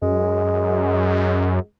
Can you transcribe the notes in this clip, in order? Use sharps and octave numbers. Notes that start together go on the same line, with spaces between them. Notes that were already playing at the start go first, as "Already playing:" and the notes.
F#2 G#3